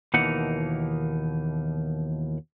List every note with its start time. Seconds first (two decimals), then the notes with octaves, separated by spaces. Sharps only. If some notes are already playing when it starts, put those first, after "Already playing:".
0.14 D#2 B2 E3 A#3 D#4 F#5